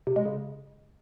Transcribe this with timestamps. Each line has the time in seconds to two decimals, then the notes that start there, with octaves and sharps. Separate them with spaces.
0.07 C3
0.16 G#3
0.25 C#3